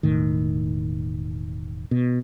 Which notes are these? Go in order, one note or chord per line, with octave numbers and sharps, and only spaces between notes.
E1 A2 D#3
B2